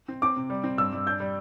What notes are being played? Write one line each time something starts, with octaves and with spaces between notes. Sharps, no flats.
C4
C4 D6
C3
G3
C4
G2 E6
G2
D4 G6
G3